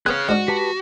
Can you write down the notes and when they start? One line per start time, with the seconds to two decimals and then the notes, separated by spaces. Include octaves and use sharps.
0.06 B3 C4 G#4 C#5 F6 F#6
0.29 G#2 D4 F#4
0.48 G4 B4 A5